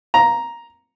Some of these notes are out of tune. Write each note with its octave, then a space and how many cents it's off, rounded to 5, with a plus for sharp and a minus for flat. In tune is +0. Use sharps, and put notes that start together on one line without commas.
A#5 +5